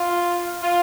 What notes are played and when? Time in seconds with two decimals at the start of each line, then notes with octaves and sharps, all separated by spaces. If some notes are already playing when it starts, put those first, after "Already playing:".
Already playing: F4
0.62 F4